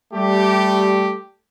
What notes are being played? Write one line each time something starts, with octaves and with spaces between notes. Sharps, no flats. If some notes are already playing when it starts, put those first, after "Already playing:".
G3 A3 G4